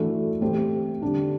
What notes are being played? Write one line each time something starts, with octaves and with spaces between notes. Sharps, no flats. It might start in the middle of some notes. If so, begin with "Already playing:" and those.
Already playing: E3 A3 D4 F#4 A4
A3 C4 G4 C5
D3 G3 D4